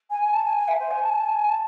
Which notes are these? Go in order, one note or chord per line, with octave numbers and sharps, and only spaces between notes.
G#5
G#5
A5
G#5
G#5
E5
C5
G#5
A5
G#5
A5
G#5
G#5
A5